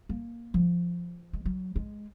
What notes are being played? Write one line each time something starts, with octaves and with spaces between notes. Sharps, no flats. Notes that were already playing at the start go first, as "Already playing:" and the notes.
A#3
F3
G#3
F#3
G#3